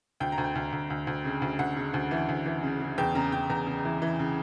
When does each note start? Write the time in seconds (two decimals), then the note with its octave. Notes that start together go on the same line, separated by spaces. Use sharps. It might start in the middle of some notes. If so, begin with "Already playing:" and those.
0.20 D2 G5
0.32 A#5
0.38 D2
0.44 G5
0.55 D2
0.72 D2
0.90 D2
1.07 D2
1.25 C#3
1.42 D2
1.59 D2 F#5
1.76 C#3
1.94 D2
2.11 E3
2.29 D2
2.46 E3
2.63 C#3
2.80 C#3
2.98 E2 G5
3.15 C#3 A#5
3.32 C#3 G5
3.50 E2 A#5
3.66 C#3
3.85 E3
4.02 E3
4.19 C#3